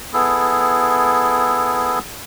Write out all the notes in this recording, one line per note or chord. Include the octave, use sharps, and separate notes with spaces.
B3 E4 G#4 A4